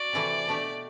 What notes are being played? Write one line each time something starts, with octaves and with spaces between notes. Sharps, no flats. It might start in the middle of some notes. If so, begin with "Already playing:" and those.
Already playing: F#4 D5
C3 E3 A3 E4 A4
B2 A3 D4 G4